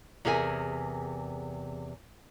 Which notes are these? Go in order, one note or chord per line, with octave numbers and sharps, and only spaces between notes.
E2 C3 G#4 A#4 E5 G#5